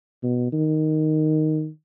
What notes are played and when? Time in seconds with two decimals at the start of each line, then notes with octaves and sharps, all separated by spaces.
0.23 B2
0.52 D#3